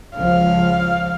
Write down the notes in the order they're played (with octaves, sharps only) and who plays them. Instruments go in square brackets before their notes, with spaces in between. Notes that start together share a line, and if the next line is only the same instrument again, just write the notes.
[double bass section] C#2 F3 [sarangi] F5